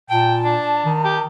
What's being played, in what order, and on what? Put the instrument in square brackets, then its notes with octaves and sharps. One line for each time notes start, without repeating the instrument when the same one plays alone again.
[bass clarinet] A#2 [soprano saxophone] G5 [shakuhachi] A5
[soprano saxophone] D4
[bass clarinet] D#3
[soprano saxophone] G4